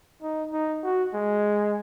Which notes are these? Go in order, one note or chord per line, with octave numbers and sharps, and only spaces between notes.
D#4
D#4
F#4
G#3